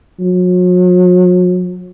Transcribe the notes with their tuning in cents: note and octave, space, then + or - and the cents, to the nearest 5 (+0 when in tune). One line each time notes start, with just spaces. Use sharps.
F#3 -40